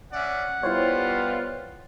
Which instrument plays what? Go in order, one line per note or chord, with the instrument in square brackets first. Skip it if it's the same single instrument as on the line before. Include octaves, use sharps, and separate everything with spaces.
[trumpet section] C#4 D5 E5 [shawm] F#5
[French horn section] G3 B3 [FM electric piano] E4 C5 C#5 [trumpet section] F4